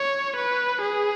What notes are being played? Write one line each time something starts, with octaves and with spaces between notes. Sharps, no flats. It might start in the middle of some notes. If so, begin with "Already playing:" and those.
Already playing: C#5
B4
G#4